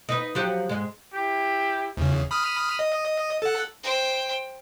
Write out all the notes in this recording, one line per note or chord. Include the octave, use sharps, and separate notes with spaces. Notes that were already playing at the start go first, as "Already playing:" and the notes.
D#4 B4
F3 F#3 G4
G#2 G#3
E4 G4
E2 C#3
B5 D#6 F6
D#5
A4 F#5
C5 G5